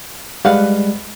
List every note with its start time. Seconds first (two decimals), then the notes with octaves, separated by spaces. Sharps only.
0.45 G3 G#3 B4 F5 F#5